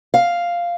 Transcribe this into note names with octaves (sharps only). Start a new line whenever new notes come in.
F5